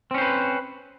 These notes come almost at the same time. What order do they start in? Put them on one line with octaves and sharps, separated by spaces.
C4 C#4 C5 B4